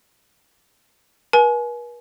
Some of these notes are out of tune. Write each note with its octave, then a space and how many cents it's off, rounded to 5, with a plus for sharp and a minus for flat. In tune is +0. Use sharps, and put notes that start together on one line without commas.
B4 -45 G#5 +30